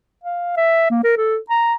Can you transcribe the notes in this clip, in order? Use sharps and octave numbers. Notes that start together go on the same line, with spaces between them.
F5
E5
A#3
A#4
A4
A#5